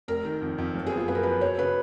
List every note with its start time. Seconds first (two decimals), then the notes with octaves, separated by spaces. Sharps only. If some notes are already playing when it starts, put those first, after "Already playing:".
0.08 F1 A#4
0.25 D#3
0.42 F2
0.58 F2
0.74 F#1
0.86 G#4
0.92 B3
0.97 F4
1.08 F#2 B4
1.15 A#4
1.23 F3 B4
1.41 F#3 C#5
1.58 C#3 B4